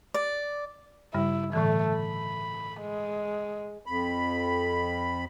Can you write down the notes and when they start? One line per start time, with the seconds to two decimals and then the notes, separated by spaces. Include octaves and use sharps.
0.14 D5
1.14 G2 C#3 G3 E4
1.53 A2 D3 E3 A3
1.97 B5
2.81 G#3
3.86 F2 B5